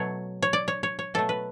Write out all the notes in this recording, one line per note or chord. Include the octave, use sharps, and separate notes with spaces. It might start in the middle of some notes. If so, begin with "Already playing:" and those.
Already playing: B2 F#3 A3 C#5
C#5
D5
C#5
C#5
C#5
B2 F#3 A3 A4
B4